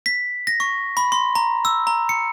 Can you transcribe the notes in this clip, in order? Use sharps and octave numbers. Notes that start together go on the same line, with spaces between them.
B6
A#6
C#6
B5
C6
A#5
E6
A#5
C#7